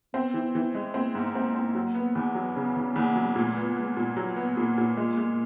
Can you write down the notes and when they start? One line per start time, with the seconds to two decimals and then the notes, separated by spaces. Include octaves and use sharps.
0.14 B3 C4
0.34 E3
0.55 E3
0.75 G#3
0.94 A#3 C4
1.15 G#2
1.34 A#3 C4
1.55 C4
1.75 F#3
1.95 B3
2.15 E2
2.35 F#3
2.56 C#3 B3
2.76 E2
2.96 E2 A#3
3.15 F#3
3.36 A#2 A3
3.56 B3
3.77 G#3 B3
3.97 A#2
4.17 F#3
4.36 B3
4.56 A#2 A#3
4.78 A#2
4.97 G#3 A#3
5.17 G#3